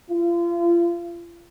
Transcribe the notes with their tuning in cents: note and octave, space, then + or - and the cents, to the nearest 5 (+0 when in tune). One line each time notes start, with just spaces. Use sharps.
F4 -35